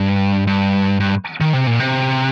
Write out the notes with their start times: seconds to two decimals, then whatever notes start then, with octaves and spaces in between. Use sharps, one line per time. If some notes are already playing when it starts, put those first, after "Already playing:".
Already playing: G2
0.47 G2
1.00 G2
1.41 D#3
1.53 C3
1.67 A#2
1.80 C3